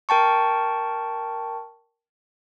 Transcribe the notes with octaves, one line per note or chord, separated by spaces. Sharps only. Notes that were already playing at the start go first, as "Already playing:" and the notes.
A#4 G5 A5 C#6